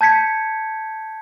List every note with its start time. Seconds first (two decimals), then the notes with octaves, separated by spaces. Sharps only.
0.01 A5 G6 G#6 B6 C#7